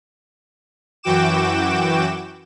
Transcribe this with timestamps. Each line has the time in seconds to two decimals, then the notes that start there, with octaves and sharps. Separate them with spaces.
1.03 F#2 E3 F#4 G5 D6 E7